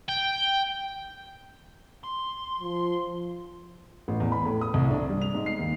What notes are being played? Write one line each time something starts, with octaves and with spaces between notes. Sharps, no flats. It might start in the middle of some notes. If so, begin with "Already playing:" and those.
G5
C6
F3
A1
E2
B5
A2
D#6
C2
D4
G3
F7
G#2
C7
D#2